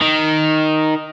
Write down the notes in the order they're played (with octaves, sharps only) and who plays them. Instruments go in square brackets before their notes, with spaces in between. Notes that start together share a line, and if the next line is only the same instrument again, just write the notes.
[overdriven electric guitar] D#3